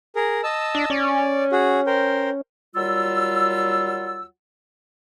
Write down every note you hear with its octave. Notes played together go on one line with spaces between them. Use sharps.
G#4 A#4
D#5 A5 E6
D4
C#4 D5
F#4 G#4
A#4 C5 G5
D#2 F#3 G3 F4 F#5 E6